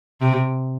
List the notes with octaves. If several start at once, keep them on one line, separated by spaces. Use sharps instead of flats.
C3